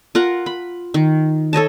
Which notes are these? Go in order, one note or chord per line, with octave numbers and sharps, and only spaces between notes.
F4 A#4 F#5
B5
D#3
A4 C#5 D#5 A5